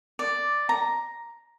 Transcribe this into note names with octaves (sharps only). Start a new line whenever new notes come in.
D5
A#5